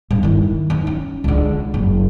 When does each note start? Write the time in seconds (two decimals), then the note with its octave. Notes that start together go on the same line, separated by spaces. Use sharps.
0.11 G2
0.23 D#3 E4
0.70 D#3
0.87 C#4
1.24 C#2 D3
1.74 F#1